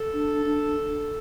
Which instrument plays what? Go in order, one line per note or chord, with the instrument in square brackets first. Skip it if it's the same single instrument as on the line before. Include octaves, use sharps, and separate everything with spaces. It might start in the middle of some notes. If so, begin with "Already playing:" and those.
Already playing: [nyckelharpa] A4
[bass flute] D4
D4